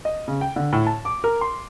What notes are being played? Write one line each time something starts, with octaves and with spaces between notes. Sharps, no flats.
D#5
C#3
G5
D3
A2
A5
D6
A#4
C6